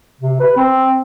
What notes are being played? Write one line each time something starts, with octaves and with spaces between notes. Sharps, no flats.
C3
B4
C4